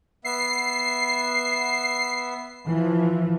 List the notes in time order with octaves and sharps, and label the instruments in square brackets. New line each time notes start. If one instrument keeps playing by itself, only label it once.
[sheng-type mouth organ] B3 E5 [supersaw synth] C7
[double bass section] E3 F3